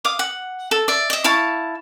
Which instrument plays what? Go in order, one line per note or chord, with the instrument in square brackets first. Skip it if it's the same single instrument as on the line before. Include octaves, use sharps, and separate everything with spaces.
[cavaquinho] F5 D6 D#6
F#5
A4
D5 E5
D#5 E5
E4 F5 A5 C#6